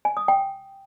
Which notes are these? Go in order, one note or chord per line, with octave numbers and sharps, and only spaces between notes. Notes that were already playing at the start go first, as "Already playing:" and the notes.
G#5
D#6
G5